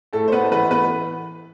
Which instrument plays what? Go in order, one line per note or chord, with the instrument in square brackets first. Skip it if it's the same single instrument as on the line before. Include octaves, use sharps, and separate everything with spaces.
[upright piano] A2 A3 A4
C5
B3 B4
E3 B3 B4
B3 B4